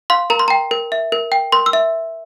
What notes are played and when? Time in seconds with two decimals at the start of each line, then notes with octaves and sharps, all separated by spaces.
0.10 F5 C6
0.30 A#4 A#5
0.39 C6
0.48 G5 A#5
0.71 A#4
0.92 E5
1.12 A#4
1.32 G5
1.52 A#4 C6
1.66 E6
1.73 E5